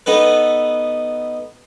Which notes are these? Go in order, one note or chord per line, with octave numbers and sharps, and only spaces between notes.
B3 D#4 A4 B4